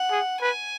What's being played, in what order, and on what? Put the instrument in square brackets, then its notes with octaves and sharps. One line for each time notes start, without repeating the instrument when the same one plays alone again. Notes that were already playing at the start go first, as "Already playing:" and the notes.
Already playing: [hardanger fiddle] F#5
[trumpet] G#4
[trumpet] B4 [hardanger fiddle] G#5